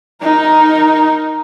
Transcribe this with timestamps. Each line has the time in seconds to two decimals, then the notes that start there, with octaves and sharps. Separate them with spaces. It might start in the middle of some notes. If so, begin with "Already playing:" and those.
0.22 D#4 A#4